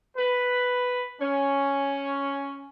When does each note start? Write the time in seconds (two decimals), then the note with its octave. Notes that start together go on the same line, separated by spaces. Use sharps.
0.17 B4
1.21 C#4